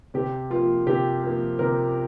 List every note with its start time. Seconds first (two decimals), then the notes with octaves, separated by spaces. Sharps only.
0.14 C3 G4
0.50 F3 A#3 F4
0.87 C3 G4
1.23 F3 A#3
1.59 C3 A#4